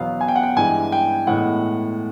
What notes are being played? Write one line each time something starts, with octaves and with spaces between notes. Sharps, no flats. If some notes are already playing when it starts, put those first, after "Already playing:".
Already playing: E2 B2 F#3 B3 F5
G#5
G5
F#5
G5
G2 E3 G#3 G#5
G5
A2 E3 G#3 B3 F#5